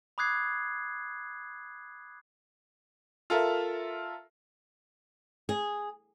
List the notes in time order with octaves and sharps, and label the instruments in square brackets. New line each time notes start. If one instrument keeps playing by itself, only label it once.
[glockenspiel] B5 D6 D#6 F#6 G#6 C7
[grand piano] F4 A4 A#4 E5
[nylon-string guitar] G#4